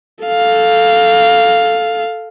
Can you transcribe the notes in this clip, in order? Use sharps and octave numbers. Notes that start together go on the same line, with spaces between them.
A4 F5